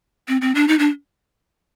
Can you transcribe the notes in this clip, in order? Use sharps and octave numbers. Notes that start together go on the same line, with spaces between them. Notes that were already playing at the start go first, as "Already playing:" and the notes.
C4
C4
D4
D#4
D4